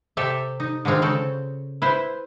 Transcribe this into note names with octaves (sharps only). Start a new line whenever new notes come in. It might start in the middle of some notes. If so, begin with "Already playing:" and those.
C3 G4 A4 E5
D#4
D3 D#3 G#3 C4 F4
C#3 C4 A4
E4 B4 C5